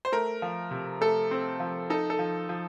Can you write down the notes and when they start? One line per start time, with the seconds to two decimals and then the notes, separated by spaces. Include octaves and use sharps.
0.05 C5
0.12 A3 A#4
0.42 F3
0.71 C3
1.01 A3 A4
1.31 C4
1.60 F3
1.90 D#4 A4
2.10 A4
2.19 F3
2.49 F3